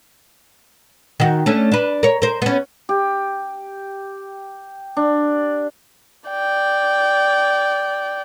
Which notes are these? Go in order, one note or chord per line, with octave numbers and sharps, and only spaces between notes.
D#3 F#4
A3 C#4 D4
D4 B4
A#4 C#5
A#4 C5
B3 C#4
G4
D4
D5 G5